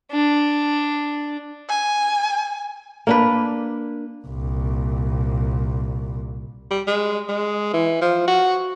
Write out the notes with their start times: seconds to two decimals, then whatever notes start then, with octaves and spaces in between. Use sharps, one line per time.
0.12 D4
1.69 G#5
3.07 A#3 D4 B4
4.27 C2 A#2
6.71 G3
6.87 G#3
7.29 G#3
7.73 E3
8.01 F3
8.28 F#4